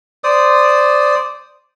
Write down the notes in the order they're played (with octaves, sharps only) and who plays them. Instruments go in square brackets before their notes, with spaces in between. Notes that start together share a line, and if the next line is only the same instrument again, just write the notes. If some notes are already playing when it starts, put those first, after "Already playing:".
[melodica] C5 D5 D#6